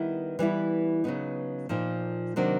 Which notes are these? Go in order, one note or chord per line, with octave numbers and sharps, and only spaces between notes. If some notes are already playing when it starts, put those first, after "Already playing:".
Already playing: D#3 G3 B3 E4
E3 G3 B3 E4
C#3 F#3 B3 D#4
A#2 F3 A#3 D#4
C3 D#3 F#3 A#3 D4